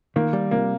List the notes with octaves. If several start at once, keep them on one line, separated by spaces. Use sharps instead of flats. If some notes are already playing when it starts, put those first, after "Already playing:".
D#3 A#3
G3
C3 A#3